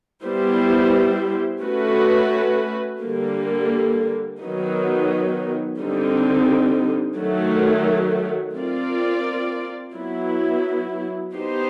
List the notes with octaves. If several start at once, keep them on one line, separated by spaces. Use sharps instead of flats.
G3 B3 E4 G4 C5
A3 C#4 F#4 B4
D3 G3 A#3
D#3 F#3 B3 D#4
D3 G3 C4 D#4
D#3 F#3 A3
C4 F4 A#4 D5
F#3 B3 E4
B3 D#4 G4 C5